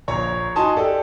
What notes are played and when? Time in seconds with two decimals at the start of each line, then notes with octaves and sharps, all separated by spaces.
0.08 A#1 C#5 A#5
0.56 D#4 F#4 G#5 A5 C6 D#6
0.77 G4 A4 D5